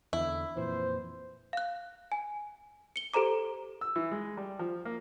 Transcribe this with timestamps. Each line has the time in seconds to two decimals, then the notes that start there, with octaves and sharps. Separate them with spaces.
0.13 E2 D3 E4
0.57 F2 A#2 E3 C5
1.53 F5 F#6
2.12 G#5
2.96 C#7 G7
3.13 G4 A4 C5 A#5 D6
3.81 E6
3.96 E3
4.11 G#3
4.37 G3
4.59 F3
4.85 A#3